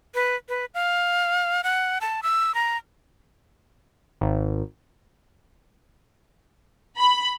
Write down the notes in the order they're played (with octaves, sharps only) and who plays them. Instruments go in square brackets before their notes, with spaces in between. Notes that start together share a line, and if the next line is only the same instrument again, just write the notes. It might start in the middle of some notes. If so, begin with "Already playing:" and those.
[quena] B4
B4
F5
F#5
A5
E6
A#5
[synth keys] G#1
[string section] B5